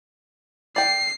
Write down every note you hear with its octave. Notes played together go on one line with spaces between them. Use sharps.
D5 G5 C7